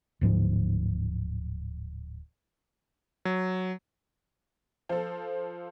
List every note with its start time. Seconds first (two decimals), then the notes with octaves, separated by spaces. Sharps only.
0.21 D1 G#2 F3
3.25 F#3
4.89 F3 A4